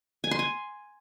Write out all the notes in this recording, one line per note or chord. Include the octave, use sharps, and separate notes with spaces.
G#5
C6
G#5